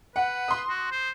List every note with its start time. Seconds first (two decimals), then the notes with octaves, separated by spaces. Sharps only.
0.16 B4 F#5
0.48 C6 D#6
0.69 F#4
0.92 C5